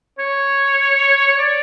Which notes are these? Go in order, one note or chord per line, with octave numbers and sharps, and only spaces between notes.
C#5
C#5
D5